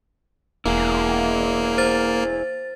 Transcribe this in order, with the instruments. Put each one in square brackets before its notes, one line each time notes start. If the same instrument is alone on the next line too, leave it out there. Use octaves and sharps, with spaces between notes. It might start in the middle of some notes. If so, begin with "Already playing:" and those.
[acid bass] E1 [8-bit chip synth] A#3 [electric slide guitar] E4 G#4
[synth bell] C5 A6